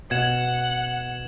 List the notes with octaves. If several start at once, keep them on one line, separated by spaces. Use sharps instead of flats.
B2 F#5 G#6 E7 F#7